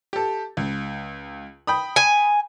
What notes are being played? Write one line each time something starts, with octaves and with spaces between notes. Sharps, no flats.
G4 A4
C#2
G5 B5 D#6
G#5